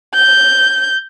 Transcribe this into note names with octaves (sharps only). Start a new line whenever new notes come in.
G6